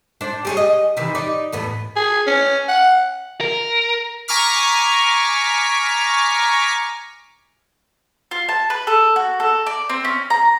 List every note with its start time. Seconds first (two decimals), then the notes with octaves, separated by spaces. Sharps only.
0.21 D4 C5
0.45 G4 G#4 C#5
0.57 D#5
0.97 C3 D#3 E3
1.15 D#4 D5
1.52 E2 A2 B3
1.96 G#4
2.27 C#4
2.69 F#5
3.41 A#4
4.28 G#5 A#5 C#6 D6 F6 B6
8.31 F4
8.49 A5
8.70 B4
8.87 A4
9.16 F#4
9.40 A4
9.66 D5
9.90 C4
10.05 C#4
10.30 A#5